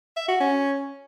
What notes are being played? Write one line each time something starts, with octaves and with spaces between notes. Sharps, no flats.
E5
F#4
C#4